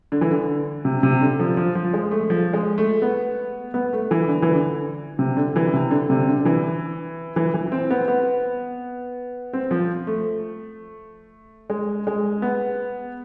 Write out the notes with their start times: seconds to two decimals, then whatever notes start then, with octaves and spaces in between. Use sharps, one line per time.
0.12 D3
0.21 E3
0.31 D3
0.85 C3
1.03 C3
1.21 D3
1.39 F3
1.57 F3
1.75 F3
1.93 G#3
2.11 A3
2.30 F3
2.53 G#3
2.78 A3
3.02 B3
3.74 B3
3.93 A3
4.11 E3
4.28 D3
4.42 E3
4.55 D3
5.19 C3
5.37 D3
5.56 E3
5.73 C3
5.91 D3
6.10 C3
6.28 D3
6.40 D3
6.45 E3
7.36 E3
7.54 E3
7.72 C4
7.90 B3
8.08 B3
9.53 C4
9.71 F3
10.07 A3
11.70 G#3
12.07 G#3
12.42 B3